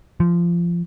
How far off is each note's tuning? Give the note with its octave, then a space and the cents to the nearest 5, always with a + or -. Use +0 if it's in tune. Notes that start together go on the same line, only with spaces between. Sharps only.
F3 -20